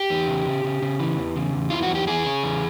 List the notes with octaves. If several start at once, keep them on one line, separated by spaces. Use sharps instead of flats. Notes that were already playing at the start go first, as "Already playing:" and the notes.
Already playing: G4
E2
C#3
C#3
C#3
C#3
E3
E2
C#3
E2
E3 F4
F#4
E2
G4
E3 G#4
C#3
E2